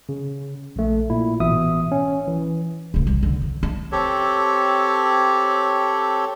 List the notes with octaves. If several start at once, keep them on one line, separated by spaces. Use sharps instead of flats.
C#3
A#1 A3
A#2 E4
A1 B2 E3 E5 D#6
C#4
E3
D1 C#3
C2
D3
D3
D4
C4 G4 A4 C#5